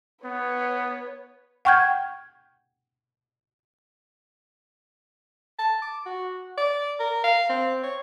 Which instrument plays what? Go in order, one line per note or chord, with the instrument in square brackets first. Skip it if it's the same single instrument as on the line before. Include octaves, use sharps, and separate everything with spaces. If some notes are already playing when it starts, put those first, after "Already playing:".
[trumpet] B3 [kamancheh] B4 C#5
[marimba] F#5 G5 C#6 F6 G6 G#6
[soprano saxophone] A5
D6
F#4
D5
A#4
F5
C4
C#5